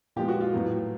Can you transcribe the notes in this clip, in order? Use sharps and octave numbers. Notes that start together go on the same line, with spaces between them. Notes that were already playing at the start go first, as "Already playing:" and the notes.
A#2 F3 G#3 B3 G4
F#4
F4
A2 F#3 B3